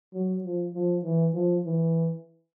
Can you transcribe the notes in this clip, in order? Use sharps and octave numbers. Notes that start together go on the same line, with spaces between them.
F#3
F3
F3
E3
F3
E3